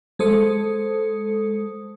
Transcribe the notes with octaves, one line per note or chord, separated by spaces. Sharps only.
G#3 A4 C5 D#6 C#7